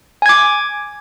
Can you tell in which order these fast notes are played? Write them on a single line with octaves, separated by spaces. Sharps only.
G#5 G#6 D6